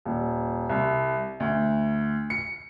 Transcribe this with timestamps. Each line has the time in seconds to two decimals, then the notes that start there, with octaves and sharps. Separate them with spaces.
0.05 D#1
0.70 C2
1.40 D2
2.30 C#7